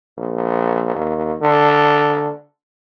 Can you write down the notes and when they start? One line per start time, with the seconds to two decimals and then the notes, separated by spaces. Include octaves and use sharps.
0.18 A#1
0.95 D#2
1.42 D3